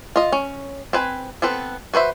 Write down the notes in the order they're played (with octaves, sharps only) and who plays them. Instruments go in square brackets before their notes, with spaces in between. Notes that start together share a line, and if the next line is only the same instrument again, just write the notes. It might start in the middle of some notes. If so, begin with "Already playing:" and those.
[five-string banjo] F4 D#5
C#4
C4 B4 G#5
B3 C4 A4 B4
F#4 B4 C5 E5